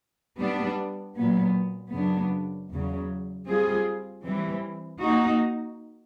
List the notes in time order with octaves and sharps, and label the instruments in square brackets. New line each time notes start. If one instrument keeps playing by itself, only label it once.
[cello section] G3 B3 D4
A#2 F#3 B3
F#2 C#3 F#3 B3 D4
E2 C#3 F#3
G3 C4 F4 G#4
E3 G3 C4
A#3 D#4 F#4